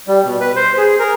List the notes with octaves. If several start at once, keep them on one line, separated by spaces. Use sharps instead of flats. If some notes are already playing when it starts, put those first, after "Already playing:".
G3
B2
B4
C5
G#4
A#4